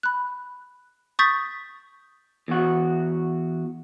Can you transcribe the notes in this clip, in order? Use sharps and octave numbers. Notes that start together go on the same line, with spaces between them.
B5 F#6
C#6 D#6 G6 A6 B6
E2 F#4